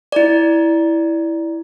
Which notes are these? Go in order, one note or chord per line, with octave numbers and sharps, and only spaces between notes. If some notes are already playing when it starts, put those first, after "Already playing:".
E4 D5